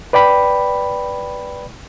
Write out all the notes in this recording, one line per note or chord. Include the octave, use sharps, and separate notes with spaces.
B4 D5 G5 B5